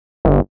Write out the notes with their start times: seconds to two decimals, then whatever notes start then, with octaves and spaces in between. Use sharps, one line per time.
0.25 G1